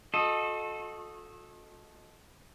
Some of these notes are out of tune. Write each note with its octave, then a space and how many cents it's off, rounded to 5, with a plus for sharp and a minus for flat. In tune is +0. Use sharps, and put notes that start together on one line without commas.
F#4 -45 A4 -15 D#5 -5